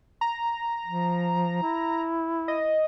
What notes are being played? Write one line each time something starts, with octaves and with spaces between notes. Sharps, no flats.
A#5
F3
E4
D#5